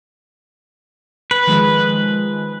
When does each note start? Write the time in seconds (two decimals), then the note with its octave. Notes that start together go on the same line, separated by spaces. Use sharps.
1.31 B4
1.47 D#3 F3 G#3